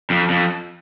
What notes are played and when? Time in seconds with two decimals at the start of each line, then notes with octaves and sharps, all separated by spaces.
0.10 F2
0.30 F2